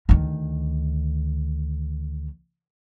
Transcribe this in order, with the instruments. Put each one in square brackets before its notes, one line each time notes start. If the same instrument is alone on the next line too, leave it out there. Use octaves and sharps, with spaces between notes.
[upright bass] D2 D#3